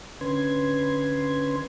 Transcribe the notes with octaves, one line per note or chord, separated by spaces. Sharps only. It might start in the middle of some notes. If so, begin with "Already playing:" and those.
D3 C#4 B4 C6 G#6